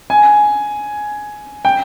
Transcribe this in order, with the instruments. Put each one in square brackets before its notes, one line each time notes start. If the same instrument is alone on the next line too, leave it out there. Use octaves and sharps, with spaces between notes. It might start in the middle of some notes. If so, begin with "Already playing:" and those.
[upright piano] G#5
G5